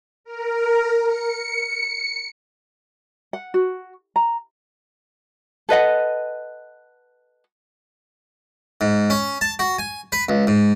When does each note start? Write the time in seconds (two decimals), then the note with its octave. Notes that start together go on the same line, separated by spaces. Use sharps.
0.24 A#4
1.06 C#7
3.33 F#5
3.54 F#4
4.16 A#5
5.69 A4 B4 D#5 F#5
8.81 G#2
9.10 C#4
9.41 A5
9.59 F#4
9.79 G#5
10.12 B4
10.29 C#2
10.47 G#2